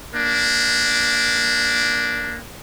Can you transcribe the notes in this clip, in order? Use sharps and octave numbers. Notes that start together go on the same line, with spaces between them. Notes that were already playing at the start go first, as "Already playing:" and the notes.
A#3 D4